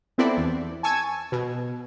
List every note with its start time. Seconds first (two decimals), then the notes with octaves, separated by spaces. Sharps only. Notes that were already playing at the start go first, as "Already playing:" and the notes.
0.18 B3 C4 E4 A4 D5
0.37 E2
0.83 G#5 A5 C#6 E6 G#6
1.32 B2